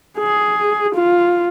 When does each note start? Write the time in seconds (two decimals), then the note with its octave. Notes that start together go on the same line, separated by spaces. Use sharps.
0.19 G#4
0.95 F4